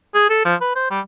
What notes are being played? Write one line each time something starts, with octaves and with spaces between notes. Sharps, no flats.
G#4
A4
F3
B4
C5
G3